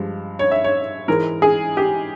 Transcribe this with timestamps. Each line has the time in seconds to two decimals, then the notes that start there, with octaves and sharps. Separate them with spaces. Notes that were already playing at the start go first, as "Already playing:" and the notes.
Already playing: G2 F3 G#3
0.39 C#5
0.51 E5
0.64 C#5
1.08 G#2 E3 G#3 A#4
1.42 G#4
1.77 G4